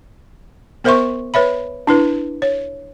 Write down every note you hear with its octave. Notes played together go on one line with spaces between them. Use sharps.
B3 A#4 C5 E5 C6 C#6
B4 C#5 E5 B5
D4 E4 B4
C#5